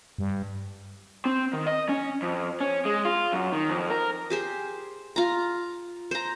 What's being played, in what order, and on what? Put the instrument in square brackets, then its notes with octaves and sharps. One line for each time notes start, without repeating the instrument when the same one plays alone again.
[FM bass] G2
[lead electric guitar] C4
D#3
D#5
C#4
F2
C#4
G#3
F4
F#2
D#3
F2
A#4
[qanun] G4 G#4 C5
F4 A#5
C5 A#5